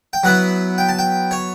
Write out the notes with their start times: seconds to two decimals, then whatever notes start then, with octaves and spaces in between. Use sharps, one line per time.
0.13 G5
0.23 F#3 B3 E4 F#5
0.78 G5
0.89 A5
0.99 G5
1.31 C#5